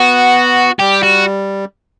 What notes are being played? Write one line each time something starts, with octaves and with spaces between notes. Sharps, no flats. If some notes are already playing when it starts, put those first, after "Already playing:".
Already playing: B3 F#4
G3 G4
F#4